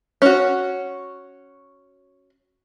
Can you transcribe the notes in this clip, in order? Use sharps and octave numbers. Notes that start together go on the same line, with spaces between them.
C#4 F#4